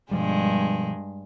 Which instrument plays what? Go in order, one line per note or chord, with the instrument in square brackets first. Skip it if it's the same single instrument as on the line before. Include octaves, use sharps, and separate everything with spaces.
[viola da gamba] G2 G#3 [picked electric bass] B2 F3 G3